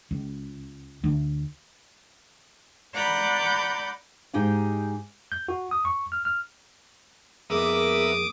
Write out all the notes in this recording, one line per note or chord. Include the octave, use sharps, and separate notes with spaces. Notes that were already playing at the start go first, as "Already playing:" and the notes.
C#2
D2
D5 F#5 A#5 B5 D6 G6
G#2 D#4 G4 G#4 F5
G6
F#4
D#6
C#6
F6
F6
F2 A#3 B3 G#4 A#4 E5 D6 D#6